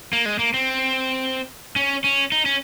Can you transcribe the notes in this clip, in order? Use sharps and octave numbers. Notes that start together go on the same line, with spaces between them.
A#3
G#3
A#3
C4
C#4
C#4
D#4
C#4